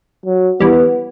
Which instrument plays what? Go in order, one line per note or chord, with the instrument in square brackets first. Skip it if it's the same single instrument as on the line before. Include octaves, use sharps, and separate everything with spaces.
[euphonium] F#3
[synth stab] E3 G3 [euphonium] B3